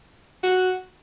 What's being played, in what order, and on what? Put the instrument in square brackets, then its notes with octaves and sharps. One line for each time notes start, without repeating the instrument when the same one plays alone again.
[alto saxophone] F#4